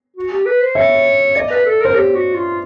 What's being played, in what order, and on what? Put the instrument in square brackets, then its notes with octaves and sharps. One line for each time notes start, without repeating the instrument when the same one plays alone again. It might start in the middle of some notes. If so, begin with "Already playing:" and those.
[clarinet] F#4
G4
B4
C5
[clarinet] C#5 [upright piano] E5
[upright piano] D5 [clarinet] D#5
[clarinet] B4
A4
[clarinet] A#4 [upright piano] C5
[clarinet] G4 [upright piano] C#5
[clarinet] F#4
F4